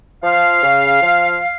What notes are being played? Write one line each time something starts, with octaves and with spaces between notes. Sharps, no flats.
F3 F5
C#3
F3